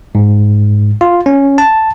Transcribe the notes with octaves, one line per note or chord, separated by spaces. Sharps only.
G#2
F4
C#4
A5